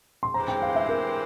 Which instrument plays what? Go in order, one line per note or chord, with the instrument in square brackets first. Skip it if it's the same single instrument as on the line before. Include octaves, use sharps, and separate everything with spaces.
[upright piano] C6
[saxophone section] E3 G#3 C4 G4 C5 [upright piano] A#5
[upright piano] G5
F5
E5
A#4